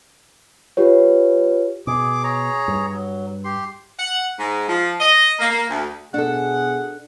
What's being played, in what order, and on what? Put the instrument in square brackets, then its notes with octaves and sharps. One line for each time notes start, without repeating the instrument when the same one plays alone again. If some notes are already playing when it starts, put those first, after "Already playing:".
[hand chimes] F4 G4 B4 C#5
[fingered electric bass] B2 [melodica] G#4 D6
[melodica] G#4 C#5 A#5
[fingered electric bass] G2
[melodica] F#3
G4 C6
[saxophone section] F#5
G#2
F3
D#5
A#3
A#3
D2
[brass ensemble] B2 G#4 [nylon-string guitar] D4 A4 [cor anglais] F#5